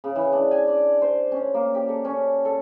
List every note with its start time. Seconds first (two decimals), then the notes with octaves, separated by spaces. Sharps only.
0.04 C#3
0.16 E3
0.32 D4
0.51 G#5
0.68 D5
1.02 C5
1.32 C#4
1.54 A#3
1.75 G4
1.89 A4
2.05 C#4
2.45 A4